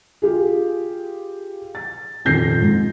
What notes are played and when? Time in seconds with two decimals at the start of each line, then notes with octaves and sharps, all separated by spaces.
0.22 F4 G4 G#4
1.75 A6
2.25 D#1 F2 D#3 G6 A#6 C7
2.60 G#2